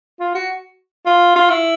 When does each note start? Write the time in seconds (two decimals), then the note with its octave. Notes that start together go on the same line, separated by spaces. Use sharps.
0.20 F4
0.35 F#4
1.06 F4
1.36 F4
1.50 E4